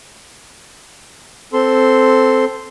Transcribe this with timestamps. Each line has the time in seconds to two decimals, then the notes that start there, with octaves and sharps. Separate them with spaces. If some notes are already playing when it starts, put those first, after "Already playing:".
1.53 C4 A4 C6